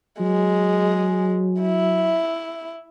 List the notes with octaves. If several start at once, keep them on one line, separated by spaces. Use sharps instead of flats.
F#3 G#3
E4